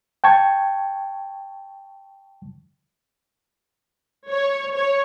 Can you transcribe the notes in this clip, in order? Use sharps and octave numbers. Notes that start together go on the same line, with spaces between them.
G5 A5 C#6 G#6
C#5
C#5